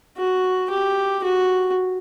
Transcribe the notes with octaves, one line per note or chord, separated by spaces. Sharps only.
F#4
G4
F#4